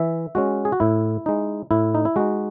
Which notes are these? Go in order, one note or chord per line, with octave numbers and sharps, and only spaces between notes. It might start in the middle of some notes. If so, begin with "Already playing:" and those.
Already playing: E3 E5
G#3 C#4 F#4
G#4
F#4
A2 E4
G#3 D#4
A2 E4
D#4
E4
G#3 D#4 F#4